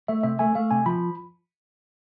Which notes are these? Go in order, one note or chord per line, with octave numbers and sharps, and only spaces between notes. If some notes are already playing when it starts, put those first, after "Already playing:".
A3 E5
C3 E5
A3 G#5
A3 F5
C3 G#5
F3 B5